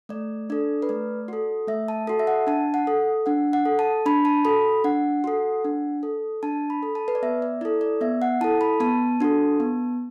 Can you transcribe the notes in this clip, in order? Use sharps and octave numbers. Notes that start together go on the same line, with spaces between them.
A3 D5
D4 A4 D5
B4
A3 D5
F#4 A4
A3 E5
A5
F#4 A4 A5
E5
F#5
D4 A5
F#5
A4
D4 F#5
F#5
A4
A5
D4 B5
A5
F#4 A4 B5
D4 F#5
F#4 A4
D4
A4
D4 A5
B5
A4
A5
B4
D5
B3 E5
D5
E4 A4 D5
D5
B3 E5
F#5
E4 A4 A5
B5
B3 A5
D4 F#4 A4
B3